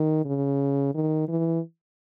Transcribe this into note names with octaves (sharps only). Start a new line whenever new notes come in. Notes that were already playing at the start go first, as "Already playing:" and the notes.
Already playing: D#3
C#3
D#3
E3